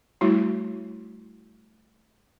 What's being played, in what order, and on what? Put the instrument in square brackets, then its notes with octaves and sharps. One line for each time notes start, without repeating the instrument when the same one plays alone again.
[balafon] G3 A3 E4 F#4